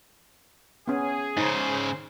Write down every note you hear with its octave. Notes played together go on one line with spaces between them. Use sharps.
B3 C#4 G#4
G#2 C#3 D#4 C5 C#5